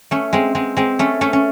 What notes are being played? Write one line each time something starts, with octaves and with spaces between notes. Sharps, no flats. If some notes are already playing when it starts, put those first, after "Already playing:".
A3 C#4
G#3 C4
G#3 C4
G#3 C4
A3 C#4
A3 C#4
C#4